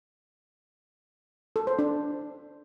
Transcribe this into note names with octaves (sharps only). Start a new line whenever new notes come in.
A4
C5
D4